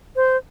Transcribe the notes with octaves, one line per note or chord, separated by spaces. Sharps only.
C5